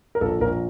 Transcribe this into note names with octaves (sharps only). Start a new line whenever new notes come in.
A#4
A#1 A4
A#1 A#4